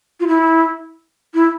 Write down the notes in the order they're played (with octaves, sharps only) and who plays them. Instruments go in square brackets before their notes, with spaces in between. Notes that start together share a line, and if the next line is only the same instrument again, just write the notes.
[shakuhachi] F4
E4
E4